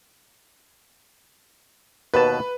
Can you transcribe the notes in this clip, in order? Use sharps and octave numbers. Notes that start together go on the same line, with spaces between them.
D#2 B2 B4 A5